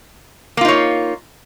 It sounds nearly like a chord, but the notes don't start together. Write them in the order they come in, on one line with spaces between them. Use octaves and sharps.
A#3 F4 D#4 C#5